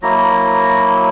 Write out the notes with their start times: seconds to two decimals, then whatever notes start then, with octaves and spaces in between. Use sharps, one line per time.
0.02 F#3 A#3 E4 A#5